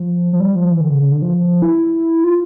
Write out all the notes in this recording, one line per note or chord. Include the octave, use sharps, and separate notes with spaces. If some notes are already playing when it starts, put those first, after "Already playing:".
Already playing: F3
F3
G3
F3
E3
D3
C#3
C#3
D3
F3
E4
F4